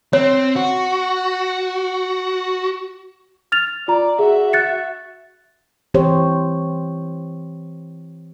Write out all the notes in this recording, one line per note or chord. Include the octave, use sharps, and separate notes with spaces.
C4 C#5
F#4
F6 A6 F7
F4 D5 A#5
F#4 G#4 E5
F#6 A6 C#7
E3 C4 G4 C5 C#5